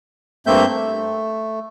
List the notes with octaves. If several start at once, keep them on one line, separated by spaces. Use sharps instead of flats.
G2 A3 A#3 C4 E5 G6
A3